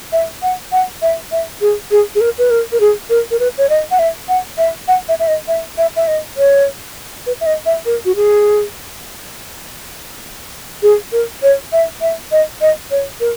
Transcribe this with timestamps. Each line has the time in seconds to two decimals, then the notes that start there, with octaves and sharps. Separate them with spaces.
0.12 E5
0.42 F#5
0.72 F#5
1.02 E5
1.32 E5
1.61 G#4
1.91 G#4
2.15 G#4
2.21 A#4
2.38 B4
2.50 A#4
2.72 A#4
2.80 G#4
3.10 A#4
3.31 A#4
3.40 B4
3.58 C#5
3.69 D#5
3.91 F#5
3.99 E5
4.29 F#5
4.58 E5
4.88 F#5
5.09 E5
5.20 E5
5.28 D#5
5.48 E5
5.78 E5
5.96 E5
6.07 D#5
6.37 C#5
7.27 B4
7.41 E5
7.46 D#5
7.66 E5
7.86 A#4
8.05 F#4
8.16 G#4
10.83 G#4
11.12 A#4
11.43 C#5
11.72 E5
12.01 E5
12.32 D#5
12.61 D#5
12.91 C#5
13.20 A#4